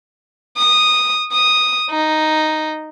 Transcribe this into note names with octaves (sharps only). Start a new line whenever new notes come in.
D#6
D#6
D#4